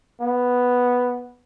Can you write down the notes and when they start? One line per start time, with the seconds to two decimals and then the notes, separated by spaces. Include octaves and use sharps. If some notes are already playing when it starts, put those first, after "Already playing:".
0.21 B3